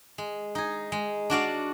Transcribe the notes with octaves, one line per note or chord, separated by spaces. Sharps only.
G#3
D#4 G#4
G#3
D4 F#4 D5 F5